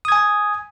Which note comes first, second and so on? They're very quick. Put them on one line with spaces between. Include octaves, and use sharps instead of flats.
D#6 G#6 G#5